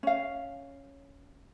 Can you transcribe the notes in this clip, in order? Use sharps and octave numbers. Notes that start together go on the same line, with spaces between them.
C#4 F5